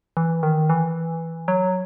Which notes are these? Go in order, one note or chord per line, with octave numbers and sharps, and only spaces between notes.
E3
D#3
E3
F#3